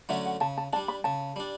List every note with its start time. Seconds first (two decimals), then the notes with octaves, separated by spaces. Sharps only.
0.09 D3 F#3 A3 C#4 E5
0.26 F#5
0.41 C#3 A5
0.58 A5
0.73 D4 A5
0.76 G3
0.88 B5
1.04 C#3 A5
1.36 G3 D4